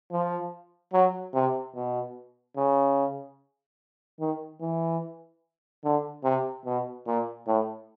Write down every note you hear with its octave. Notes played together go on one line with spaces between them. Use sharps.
F3
F#3
C3
B2
C#3
D#3
E3
D3
C3
B2
A#2
A2